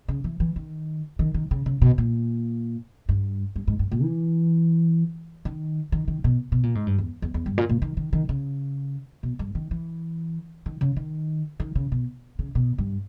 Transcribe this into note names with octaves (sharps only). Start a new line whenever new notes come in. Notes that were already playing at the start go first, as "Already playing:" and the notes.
C#3
E3
E3
D#3
D#3
D#3
C#3
C#3
B2
A#2
G2
G2
G#2
G2
A#2
E3
D#3
D#3
D#3
B2
B2
A#2
G#2
G2
E2
E2
E2
G2
A#2
A#2
D#3
D#3
D#3
C#3
B2
G2
D#3
E3
D#3
C#3
D#3
D#3
C#3
B2
C#3
B2
G2